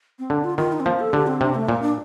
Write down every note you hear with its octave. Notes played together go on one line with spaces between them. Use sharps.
C4
D3 D4
F4
D#3 F4
D#4
C4
F3 A#3
A4
D3 G4
C4
C3 D4
A3
A#2 A#3
D4